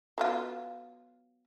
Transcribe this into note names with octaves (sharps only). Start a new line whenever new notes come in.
F#3 B3 F4